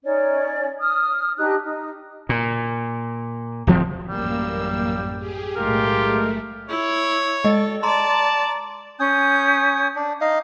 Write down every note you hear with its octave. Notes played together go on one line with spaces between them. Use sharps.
C#4 D#4 C#5 D5
D#6 F6
D4 D#4 G4 F#6
D#4
A#2
D1 F3 C4
A1 F#2 G3 A#3 E6
G4 G#4
B1 A2 G#3 A3 F4 G4 A#4
E4 C#5
G#3 A4 D#5
D5 A5 A#5 C6
C#4 G#5 D#6 G6
D4
D#4 D#5 F5